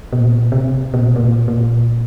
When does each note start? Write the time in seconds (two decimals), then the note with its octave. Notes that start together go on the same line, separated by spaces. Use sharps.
0.13 B2
0.19 A#2
0.52 C3
0.94 B2
1.00 A#2
1.10 B2
1.16 A#2
1.48 A#2